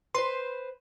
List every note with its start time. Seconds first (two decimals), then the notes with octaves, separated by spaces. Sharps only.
0.14 B4 C5 C6